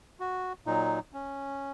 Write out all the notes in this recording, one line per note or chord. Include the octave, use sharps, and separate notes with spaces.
F#4
A#2 F#3 D#4
C#4